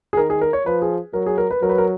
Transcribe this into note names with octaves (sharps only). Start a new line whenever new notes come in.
G#4
D#3 A#4
G#4
A#4
C#5
F3 B4
G#4
F#3 A#4
G#4
A#4
B4
F#3 A#4
B4
A#4